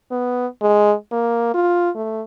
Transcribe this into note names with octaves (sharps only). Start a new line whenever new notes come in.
B3
G#3
A#3
F4
A3